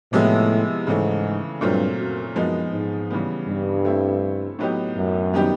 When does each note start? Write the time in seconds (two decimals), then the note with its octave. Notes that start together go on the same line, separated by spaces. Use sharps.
0.12 A2 C3 F3 G#3 B3 E4
0.87 G#2 C#3 E3 A3
1.61 G2 A#2 F#3 A3 C4 F4
1.98 F#2
2.36 F#2 F3 G#3 B3 D#4
2.72 G#2
3.10 C#3 E3 G3 B3
3.48 G2
3.85 A3 C4 E4
4.59 A2 F#3 B3 D#4 G4
4.97 F#2
5.33 D#3 G3 B3 D#4 G4